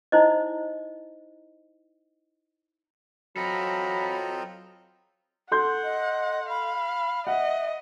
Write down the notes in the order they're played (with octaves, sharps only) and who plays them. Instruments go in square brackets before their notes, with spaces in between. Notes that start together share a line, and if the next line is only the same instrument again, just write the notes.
[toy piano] D#4 E4 C5 D#5
[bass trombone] F#3 [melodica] C4 D#5 A#5 [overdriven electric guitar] F4 A4 [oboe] B5
[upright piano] A4 C6 G6 [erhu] F#5
[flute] D#5
[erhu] F5 [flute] B5
[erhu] D#5 [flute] E5 [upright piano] F#5